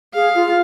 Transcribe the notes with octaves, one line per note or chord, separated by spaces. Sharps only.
G#4 F5
F4